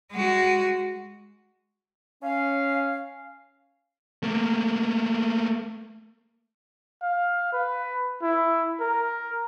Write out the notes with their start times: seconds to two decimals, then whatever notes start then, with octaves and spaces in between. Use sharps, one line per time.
0.12 G#3 F#4
2.22 C#4 F5
4.23 A3 A#3
7.02 F5
7.53 B4
8.22 E4
8.80 A#4